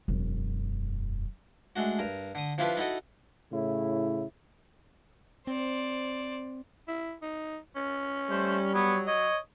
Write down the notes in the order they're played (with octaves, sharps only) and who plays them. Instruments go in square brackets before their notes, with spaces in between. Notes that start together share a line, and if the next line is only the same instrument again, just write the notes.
[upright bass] E1 F#2
[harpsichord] G#3 A3 D4 F#4
G2 A#4
D3 D#6
F3 D4 E4 F4 G4 B4
D#4 E4 F#4 A4 D#5
[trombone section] A2 C#3 E4
[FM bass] C4 [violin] C5 D5
[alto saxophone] E4
D#4
C#4
[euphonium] G3 [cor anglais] A3 [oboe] C5
[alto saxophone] F#3 [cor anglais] B3 [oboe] C#5
[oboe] C#5 [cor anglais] D#5